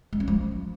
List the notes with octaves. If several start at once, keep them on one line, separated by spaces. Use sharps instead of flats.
G#3
C#4
F3